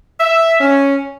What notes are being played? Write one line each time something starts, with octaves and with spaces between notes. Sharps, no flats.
E5
C#4